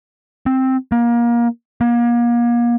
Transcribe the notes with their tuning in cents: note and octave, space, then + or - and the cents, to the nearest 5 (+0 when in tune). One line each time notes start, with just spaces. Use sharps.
C4 +5
A#3 +25
A#3 +35